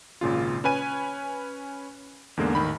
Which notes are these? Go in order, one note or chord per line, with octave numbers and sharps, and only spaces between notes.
G#1 A#2 C#3 F4
C#4 B4 G#5 D#7
E2 G#2 D3 G#3 A#3
A1 D#3 B5